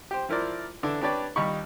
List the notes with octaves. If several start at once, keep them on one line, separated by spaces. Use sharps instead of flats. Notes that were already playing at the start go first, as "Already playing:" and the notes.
G4 C5
F3 E4 A#4 C5 D5
D3 E3 D4 E4
D4 G4 B4 C#5 D5
D#2 G3 D#4 G4 B5 C#6